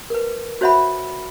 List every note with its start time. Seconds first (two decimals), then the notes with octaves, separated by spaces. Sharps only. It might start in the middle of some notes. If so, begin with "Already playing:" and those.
0.10 A#4 B4
0.61 F#4 C5 C#5 E5 F#5 B5